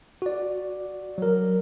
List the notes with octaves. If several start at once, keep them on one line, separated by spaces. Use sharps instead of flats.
F#4 D5
F#3 A#4